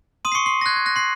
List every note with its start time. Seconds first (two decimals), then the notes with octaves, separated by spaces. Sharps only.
0.25 C6 D#6 D#7
0.32 C7
0.35 C#6 C#7
0.46 C6 C7
0.61 A#6
0.66 F#6 G#6
0.76 G#6
0.86 F#6 A#6
0.96 C6 C7